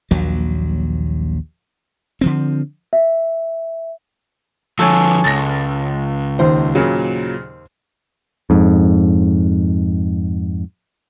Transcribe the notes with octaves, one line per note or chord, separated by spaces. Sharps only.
A#1 D#2 F#3
D3 F3 C4
E5
D3 F3 A4 C#5 G#5
C#2 A6 A#6
D#2 C5
A#2 C#3 F#3
F2 G#2